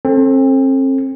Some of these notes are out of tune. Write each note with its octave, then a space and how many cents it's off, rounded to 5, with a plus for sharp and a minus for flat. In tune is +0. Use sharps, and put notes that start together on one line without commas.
C4 +35 A4 +0